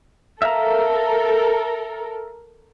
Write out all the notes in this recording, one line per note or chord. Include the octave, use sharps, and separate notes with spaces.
A4 A#4 E5 F5 A#5